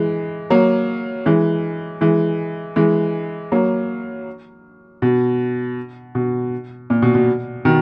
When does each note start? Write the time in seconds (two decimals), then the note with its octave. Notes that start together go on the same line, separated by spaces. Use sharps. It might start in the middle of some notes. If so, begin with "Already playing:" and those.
Already playing: E3 G#3
0.50 F#3 A#3
1.26 E3 G#3
2.01 E3 G#3
2.76 E3 G#3
3.52 F#3 A#3
5.02 B2
6.15 B2
6.90 A#2
7.02 B2
7.15 B2
7.65 B2 D#3